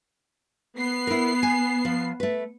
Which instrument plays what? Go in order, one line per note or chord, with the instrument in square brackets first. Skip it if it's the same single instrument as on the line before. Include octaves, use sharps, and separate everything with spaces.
[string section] B3 C7
[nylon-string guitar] E4 A#4
G#5
F3
A3 B4